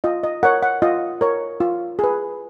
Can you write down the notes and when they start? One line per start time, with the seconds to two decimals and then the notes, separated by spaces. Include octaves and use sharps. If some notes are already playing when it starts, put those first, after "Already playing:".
0.04 F4 D#5
0.24 D#5
0.43 A#4 C#5 F#5
0.63 F#5
0.82 F4 D#5
1.21 A#4 C#5
1.60 F4
1.99 G#4 B4